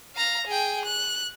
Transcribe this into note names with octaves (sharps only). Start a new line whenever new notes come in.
F5 A#5
G#4 G5
F#6